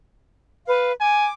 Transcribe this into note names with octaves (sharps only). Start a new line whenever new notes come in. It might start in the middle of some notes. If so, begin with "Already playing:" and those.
B4 F5
G#5 D6